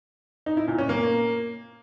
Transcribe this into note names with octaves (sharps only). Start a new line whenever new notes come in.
D#4
E4
A#2
C#4
A#3